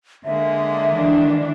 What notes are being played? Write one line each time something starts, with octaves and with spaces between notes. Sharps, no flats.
D3 G#3 A#3 E5
D#3 E3 D4